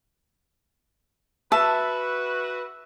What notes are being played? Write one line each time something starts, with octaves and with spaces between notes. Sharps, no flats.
F#4 B4 E5 A5